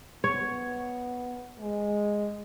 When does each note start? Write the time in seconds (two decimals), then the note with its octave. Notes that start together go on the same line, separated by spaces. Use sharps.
0.24 B3 C#5
1.60 G#3